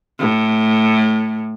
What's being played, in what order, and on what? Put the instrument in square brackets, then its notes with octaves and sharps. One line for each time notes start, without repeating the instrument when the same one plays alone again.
[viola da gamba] A2